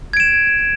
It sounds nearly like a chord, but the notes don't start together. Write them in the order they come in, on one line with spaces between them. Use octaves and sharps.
G#6 D7 E7